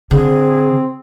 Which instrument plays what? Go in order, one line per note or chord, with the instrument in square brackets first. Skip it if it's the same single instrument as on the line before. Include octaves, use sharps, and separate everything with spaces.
[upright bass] D3 [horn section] C4 [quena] G#4